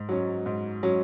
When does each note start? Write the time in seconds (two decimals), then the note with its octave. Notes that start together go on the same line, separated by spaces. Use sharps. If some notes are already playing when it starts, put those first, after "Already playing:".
Already playing: G#2
0.09 F#3 C#4
0.46 G#2
0.83 F#3 C#4